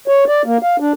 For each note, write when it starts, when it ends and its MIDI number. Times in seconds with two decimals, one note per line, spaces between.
0.08 0.24 73
0.28 0.42 74
0.46 0.57 58
0.62 0.76 77
0.80 0.93 62